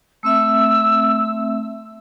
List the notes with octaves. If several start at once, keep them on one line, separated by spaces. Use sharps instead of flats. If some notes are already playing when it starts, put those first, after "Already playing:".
A3 C4 E5 E6